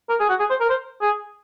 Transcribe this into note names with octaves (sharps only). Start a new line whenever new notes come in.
A#4
G#4
F#4
G#4
C5
A#4
C5
G#4